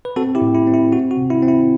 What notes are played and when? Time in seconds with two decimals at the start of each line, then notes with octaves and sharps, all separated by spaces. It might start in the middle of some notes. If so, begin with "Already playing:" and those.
0.05 B4
0.16 C4 F#4 A4
0.35 E4 G4
0.42 A2
0.55 E4
0.67 C4
0.74 E4
0.92 C4 F#4
1.11 F#4
1.17 C3
1.30 E4
1.42 C4
1.48 E4